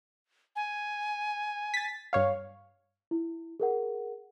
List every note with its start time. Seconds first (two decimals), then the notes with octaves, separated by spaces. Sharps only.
0.56 G#5
1.74 A6 B6
2.13 G2 C#5 F5
3.11 E4
3.60 G#4 A#4 F#5